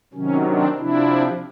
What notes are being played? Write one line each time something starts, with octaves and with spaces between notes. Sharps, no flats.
C3 D#3 F#3 C#4
C4 D4
C3 F3 D4 E4